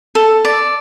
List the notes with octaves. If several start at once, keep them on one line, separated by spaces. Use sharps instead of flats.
A4
D5